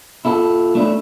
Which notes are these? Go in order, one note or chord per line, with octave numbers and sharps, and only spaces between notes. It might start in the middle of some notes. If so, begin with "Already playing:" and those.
E4 F4 A4
A3 D4 E4